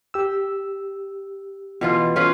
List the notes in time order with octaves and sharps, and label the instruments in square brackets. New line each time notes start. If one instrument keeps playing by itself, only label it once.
[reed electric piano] G4 E6
[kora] B2 E3 F4
C#4 F4 B4